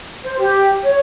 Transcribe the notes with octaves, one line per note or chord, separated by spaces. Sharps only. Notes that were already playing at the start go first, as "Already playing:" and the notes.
C5
G4
C#5